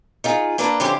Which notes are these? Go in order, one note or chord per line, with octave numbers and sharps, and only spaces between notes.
D#4 F4 G#4
A#3 D4 A4 B4 A#5
D3 F3 C4 C#4 E4 G4